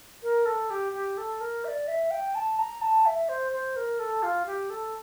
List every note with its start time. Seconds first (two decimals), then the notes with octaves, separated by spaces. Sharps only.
0.23 A#4
0.46 A4
0.70 G4
0.93 G4
1.17 A4
1.40 A#4
1.64 E5
1.68 D5
1.88 E5
2.11 G5
2.35 A5
2.59 A#5
2.81 A5
3.05 E5
3.29 C5
3.52 C5
3.76 A#4
3.99 A4
4.23 F4
4.46 G4
4.70 A4